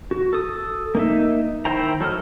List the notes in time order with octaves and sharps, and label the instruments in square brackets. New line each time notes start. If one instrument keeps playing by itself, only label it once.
[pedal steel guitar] F#4
A4 D#6
A#3 D#4 E5
D#3 E4 C5 G5 A#5
F#3 A4 D#5 F6